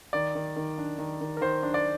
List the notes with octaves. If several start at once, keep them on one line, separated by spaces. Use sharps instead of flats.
D#3 D5
D#3
D#3
D4
D#3
D#3
A#4
D#3 C5
D4
D5